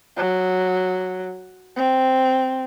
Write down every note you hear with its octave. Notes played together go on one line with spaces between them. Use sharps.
F#3
C4